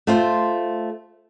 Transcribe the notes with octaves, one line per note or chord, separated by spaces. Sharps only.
A3 F4 C5